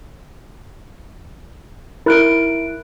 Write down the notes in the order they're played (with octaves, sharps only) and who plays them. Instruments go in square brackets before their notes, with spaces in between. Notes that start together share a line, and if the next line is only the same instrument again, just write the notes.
[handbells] E4 F#6 D7 [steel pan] A#4